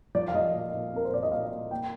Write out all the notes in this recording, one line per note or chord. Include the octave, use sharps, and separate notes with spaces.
F3 D5
F5
F3 D#5
A#2
A#2
C4 A#4
C5
A#2 D5
D#5
A#2 F5
A#2
A#3 G5